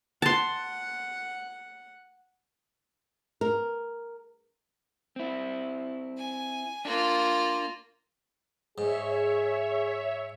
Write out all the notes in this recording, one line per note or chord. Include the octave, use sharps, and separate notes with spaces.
F#5 A5 C6
A#4
C4 E4
G#5
A#3 D4 F4
G#2 G#4 C#5 E5